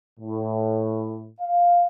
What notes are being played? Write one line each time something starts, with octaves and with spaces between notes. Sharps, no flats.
A2
F5